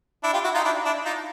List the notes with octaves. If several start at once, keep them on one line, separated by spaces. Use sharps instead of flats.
D4 E4
F4 G4
E4 F#4
D#4 F4
D4 E4
D4 E4
D#4 F4